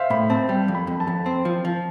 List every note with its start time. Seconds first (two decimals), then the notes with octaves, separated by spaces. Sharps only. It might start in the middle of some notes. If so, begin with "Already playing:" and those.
Already playing: C5 E5 F5
0.10 A2 B5
0.30 C4 A5
0.49 G3 G5
0.68 F2
0.75 B5
0.87 F2
1.00 A5
1.07 F2
1.26 C4
1.45 F3
1.65 F3